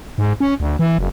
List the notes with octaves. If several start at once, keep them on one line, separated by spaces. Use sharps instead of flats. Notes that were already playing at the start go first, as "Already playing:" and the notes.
G#2
C#4
D2
E3
F#1